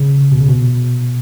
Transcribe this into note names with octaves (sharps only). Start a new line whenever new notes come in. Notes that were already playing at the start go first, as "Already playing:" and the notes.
Already playing: C#3
B2
C#3
B2